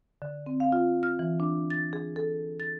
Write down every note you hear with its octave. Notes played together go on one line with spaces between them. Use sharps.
D3
C4
F5
F4
F6
E3
D4
A6
G#4
A4
A6